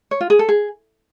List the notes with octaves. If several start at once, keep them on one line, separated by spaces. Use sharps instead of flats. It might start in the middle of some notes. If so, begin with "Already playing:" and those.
C#5
F4
G#4
A4
G#4